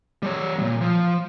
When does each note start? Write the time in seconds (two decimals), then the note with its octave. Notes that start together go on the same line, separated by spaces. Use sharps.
0.23 G3 C#5
0.59 E2 A#2
0.81 F3